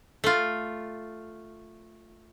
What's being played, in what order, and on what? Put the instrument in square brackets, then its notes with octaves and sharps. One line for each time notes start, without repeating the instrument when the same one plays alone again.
[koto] A3 F4